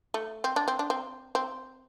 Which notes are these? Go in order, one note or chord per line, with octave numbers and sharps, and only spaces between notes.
A3
C4
D4
C4
D4
C4
C4